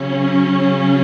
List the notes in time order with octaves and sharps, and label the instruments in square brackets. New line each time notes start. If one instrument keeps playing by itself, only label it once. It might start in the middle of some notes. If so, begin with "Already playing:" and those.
Already playing: [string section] C#3 F#3 C#4